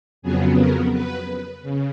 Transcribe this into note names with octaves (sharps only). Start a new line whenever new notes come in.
F2 C#3 F#3 B3 G#4
A#4
B4
C#3